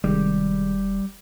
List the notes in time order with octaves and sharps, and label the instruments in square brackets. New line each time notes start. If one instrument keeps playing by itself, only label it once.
[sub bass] E1 [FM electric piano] C3 D#3 G#3 [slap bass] G3